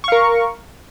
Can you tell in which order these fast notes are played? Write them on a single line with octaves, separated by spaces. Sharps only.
C#6 F5 A#4